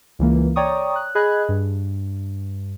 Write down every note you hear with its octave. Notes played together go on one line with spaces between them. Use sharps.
C#2 E3 A#3
C#5 D5 G5 A#5 C#6 D#6
F#6
G#4 D#5 B5 F#6 G#6
G2